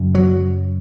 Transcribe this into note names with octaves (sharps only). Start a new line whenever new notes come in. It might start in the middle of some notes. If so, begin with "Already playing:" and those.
Already playing: F#2 C#3
F#3